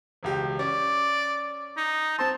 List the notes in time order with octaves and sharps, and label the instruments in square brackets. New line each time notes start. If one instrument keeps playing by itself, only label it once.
[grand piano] E1 C#2 G4
[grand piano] C#4 [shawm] D5
[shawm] D#4
[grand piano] C4 C5 C6 [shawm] A5